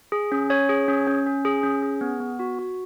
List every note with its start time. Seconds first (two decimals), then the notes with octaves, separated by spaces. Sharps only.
0.12 G#4
0.32 C#4
0.50 C#4 C#5
0.69 G#4
0.88 C#4
1.07 C#4
1.26 C#4
1.45 G#4
1.63 C#4
1.82 G#4
2.01 B3
2.20 B3
2.39 F#4
2.59 F#4